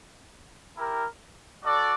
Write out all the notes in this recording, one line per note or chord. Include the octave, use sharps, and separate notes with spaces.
E4 G4 A#4
F#4 A4 D5